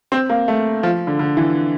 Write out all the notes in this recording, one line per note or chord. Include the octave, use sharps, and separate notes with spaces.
C4
A#3
A3
F3
D3
D3
E3